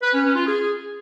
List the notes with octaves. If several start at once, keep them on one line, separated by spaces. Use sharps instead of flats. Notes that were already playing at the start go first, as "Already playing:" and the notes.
B4
C#4
C#4
F4
G#4